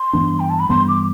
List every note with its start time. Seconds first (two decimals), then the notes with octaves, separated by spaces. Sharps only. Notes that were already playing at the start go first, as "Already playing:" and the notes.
Already playing: C6
0.13 G2 E3 B3 D4
0.40 G5
0.50 A5
0.60 B5
0.69 G2 E3 B3 D4 C6
0.88 D6